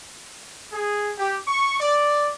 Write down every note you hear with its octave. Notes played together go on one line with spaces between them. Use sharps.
G#4
G4
C#6
D5